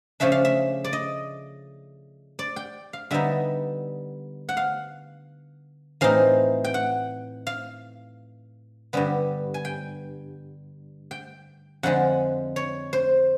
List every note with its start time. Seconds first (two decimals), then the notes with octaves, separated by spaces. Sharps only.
0.20 C#3 F3 A3 D4 E5
0.32 F5
0.45 E5
0.84 D5
0.93 D#5
2.39 D5
2.56 G5
2.93 F5
3.11 D3 G3 B3 D#4 E5
4.49 F#5
4.57 F5
6.01 A2 E3 A3 C4 D#4 F5
6.64 G5
6.74 F#5
7.47 F5
8.93 G2 D3 G3 B3
9.54 G#5
9.65 G5
11.11 G5
11.83 F2 D3 F3 G#3 F#5
12.56 C#5
12.93 C5